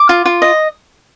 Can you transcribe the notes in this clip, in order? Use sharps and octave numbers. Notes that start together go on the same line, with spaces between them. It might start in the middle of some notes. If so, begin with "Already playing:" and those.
Already playing: D6
F4
F4
D#5